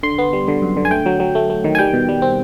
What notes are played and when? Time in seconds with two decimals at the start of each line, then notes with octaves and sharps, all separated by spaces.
0.03 D3 C6
0.18 B3
0.33 G3
0.48 D3
0.62 F#2
0.77 D3
0.85 G#5
0.91 A3 G5
1.06 F#3
1.20 F#3
1.35 A3
1.50 A3
1.64 D#3
1.75 G#5
1.79 G3 G5
1.93 B2
2.09 G3
2.22 C4